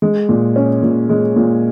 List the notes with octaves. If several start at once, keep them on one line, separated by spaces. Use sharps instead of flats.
G#3
A#2
C#4
A#2
G#3
A#2